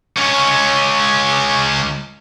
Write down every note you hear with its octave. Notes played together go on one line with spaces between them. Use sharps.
C#2 C#4